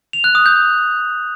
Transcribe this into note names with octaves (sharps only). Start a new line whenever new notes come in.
F7
F#6
D#6
G6